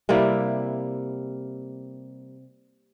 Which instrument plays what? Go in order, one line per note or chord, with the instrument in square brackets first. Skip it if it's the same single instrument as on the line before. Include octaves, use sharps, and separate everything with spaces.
[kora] C3 G3 A#3 E4